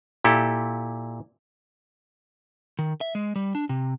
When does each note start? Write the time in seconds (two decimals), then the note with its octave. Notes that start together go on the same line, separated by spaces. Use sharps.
0.24 A#2 E4 G4 A4
2.79 D#3
3.01 E5
3.15 G#3
3.36 G3
3.55 D4
3.69 C3